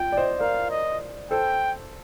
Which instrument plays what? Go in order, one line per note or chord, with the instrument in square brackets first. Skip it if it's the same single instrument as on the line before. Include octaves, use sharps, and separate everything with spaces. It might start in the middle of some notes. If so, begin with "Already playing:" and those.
Already playing: [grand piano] F4 [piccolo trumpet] G5
[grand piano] D5
C5 D#5
[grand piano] A#4 D5 [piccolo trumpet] F5
[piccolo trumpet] D#5
[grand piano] A4 C5 [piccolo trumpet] G5